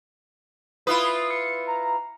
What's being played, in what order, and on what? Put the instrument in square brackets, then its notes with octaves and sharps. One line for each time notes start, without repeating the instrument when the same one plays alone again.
[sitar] E4 F4 B4 [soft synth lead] D#6
[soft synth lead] C#7
A#5